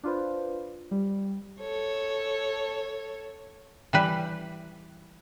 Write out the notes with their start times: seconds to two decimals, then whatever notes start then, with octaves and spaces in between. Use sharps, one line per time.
0.03 D4 F4 B4 C5
0.91 G3
1.60 A4 C#5
3.93 E3 G3 B4